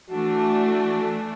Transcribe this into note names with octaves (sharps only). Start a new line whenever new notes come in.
E3 A3 D4 F#4